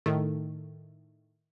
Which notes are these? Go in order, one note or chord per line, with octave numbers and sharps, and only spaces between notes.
A2 D#3 A3